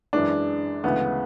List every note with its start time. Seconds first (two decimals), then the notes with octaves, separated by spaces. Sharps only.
0.13 F#2 E3 G#3 D4
0.84 D2 C#3 E3 G#3 B3